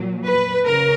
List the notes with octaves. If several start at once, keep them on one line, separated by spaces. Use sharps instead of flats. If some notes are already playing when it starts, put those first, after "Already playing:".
Already playing: A#2 F#3
B4
C#3 A#4